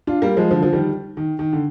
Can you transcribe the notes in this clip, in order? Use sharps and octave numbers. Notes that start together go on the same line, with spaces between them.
D4 F4
G3 A#3
F3 G#3
D3 F3
F3
D#3 G3
D#3
D#3
D3